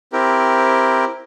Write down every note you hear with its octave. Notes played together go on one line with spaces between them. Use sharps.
C4 E4 G4 A#4